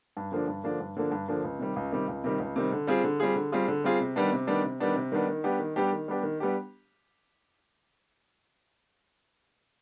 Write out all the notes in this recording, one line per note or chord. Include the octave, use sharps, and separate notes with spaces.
G2
D3 F3 A#3 D4
G2
D3 F3 A#3 D4
G2
D3 F3 A#3 D4
G2
D3 F3 A#3 D4
C#2
C3 D#3 G3
C#2
C3 D#3 G3
C#2
C3 D#3 G3
C#2
C3 D#3 G3
D3
G3 C4 F4 G#4
D3
G3 C4 F4 G#4
D3
G3 C4 F4 G#4
D3
G3 C4 F4 G#4
C3
D#3 G3 B3 D4
C3
D#3 G3 B3 D4
C3
D#3 G3 B3 D4
C3
D#3 G3 B3 D4
D#3
G3 B3 D4 G4
D#3
G3 B3 D4 G4
D#3
G3 B3 D4 G4
D#3
G3 B3 D4 G4